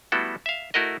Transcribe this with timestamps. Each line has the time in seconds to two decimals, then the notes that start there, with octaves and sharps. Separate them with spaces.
0.12 G3 A3 B3 E4 F#4 A4
0.46 E5 F5
0.74 A3 E4 F#4 A#4 D#5